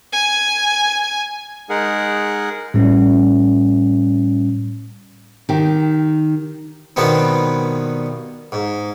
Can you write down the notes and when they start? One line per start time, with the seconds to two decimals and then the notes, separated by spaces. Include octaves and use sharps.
0.13 G#5
1.69 G#3 D#4 G#4 A#4 F#5
2.74 A2 G3 C#4
5.49 D#3 G4
6.96 G2 B2 D#3 B3 C4
8.52 G#2